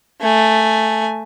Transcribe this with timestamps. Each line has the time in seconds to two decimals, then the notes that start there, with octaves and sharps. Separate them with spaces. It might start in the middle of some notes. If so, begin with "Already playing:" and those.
0.21 A3 G#5